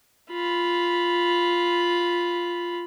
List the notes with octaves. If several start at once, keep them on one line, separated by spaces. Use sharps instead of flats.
F4 B5